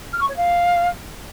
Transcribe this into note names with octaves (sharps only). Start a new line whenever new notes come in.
F6
C#6
C#5
F5